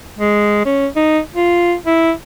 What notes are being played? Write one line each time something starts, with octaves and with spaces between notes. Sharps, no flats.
G#3
C#4
D#4
F4
E4